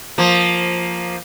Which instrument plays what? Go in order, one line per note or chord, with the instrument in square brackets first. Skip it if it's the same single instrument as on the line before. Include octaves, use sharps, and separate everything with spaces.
[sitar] F3 A#3